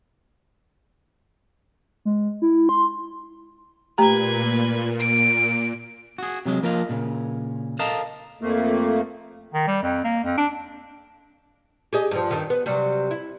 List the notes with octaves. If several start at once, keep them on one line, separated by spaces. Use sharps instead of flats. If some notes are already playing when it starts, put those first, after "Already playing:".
G#3
E4
C6
A#2 A3 G4 B4 A#5 G#6
D7
F#4 G#4
C3 F#3 G#3
F3 A#3 A#4 D#5 F5
A#2 C#3
A4 A#4 D#5 F5 A5 A#5
F2 A3 A#3
D#3
G3
F2
A#3
F2
D4
G4 G#4 D#5
G2 F3
G2 D#3
B3
C3 F#3 G3
E4